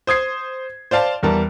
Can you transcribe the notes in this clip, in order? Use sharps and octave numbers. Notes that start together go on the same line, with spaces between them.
C5 D#6 G#6 C7
C5 D5 F5 A5
E2 G3 A#4 A5